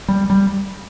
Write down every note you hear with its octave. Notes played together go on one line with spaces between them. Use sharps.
G3
G3